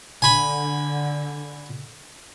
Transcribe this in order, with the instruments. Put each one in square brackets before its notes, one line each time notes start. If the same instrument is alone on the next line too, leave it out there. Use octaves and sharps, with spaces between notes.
[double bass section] D3 [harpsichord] G#5 B5